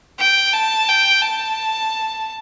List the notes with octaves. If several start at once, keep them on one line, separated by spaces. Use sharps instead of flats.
G5
A5
G5
A5